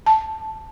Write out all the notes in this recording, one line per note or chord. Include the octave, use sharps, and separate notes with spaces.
A5